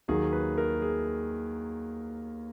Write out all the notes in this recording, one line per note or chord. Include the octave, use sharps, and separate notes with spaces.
D#2 D#3 F#3 G#4
B4
A#4
G#4